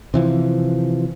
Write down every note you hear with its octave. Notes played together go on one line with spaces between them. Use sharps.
C3 E3 F3